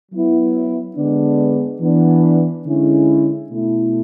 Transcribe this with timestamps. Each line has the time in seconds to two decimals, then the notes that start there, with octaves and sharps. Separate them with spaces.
0.11 F#3 B3 E4
0.96 D3 G#3 B3 D4
1.80 E3 B3 D4
2.65 D3 G#3 C#4 E4
3.50 B2 A3 E4